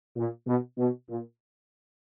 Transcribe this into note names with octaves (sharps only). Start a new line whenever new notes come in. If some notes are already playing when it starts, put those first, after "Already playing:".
A#2
B2
B2
A#2